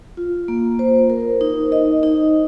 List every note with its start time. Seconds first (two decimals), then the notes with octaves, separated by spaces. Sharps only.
0.17 F4
0.48 A#3
0.79 C5
1.10 A#4
1.41 D#4
1.72 D#5
2.03 D#4